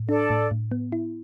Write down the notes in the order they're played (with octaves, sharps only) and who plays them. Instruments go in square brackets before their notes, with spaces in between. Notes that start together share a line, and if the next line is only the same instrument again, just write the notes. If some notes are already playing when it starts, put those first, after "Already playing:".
Already playing: [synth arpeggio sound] A2
[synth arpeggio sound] D4 [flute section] A4 D5
[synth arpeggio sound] A2
A2
B3
E4